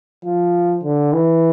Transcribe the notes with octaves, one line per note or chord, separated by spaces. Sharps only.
F3
D3
E3